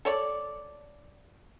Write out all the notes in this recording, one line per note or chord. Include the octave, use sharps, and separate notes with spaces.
A4 C#5 D5